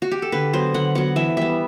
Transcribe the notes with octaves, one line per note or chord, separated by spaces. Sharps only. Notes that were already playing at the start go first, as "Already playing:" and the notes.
F#4
G4
A4
D3 B4
F#3 B3 C5
D3 F#5
F#3 B3 F#5
E3 E5
G3 B3 E5